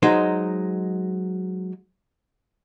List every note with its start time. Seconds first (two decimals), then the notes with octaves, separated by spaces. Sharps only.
0.03 F#3 G#3 D#4 C5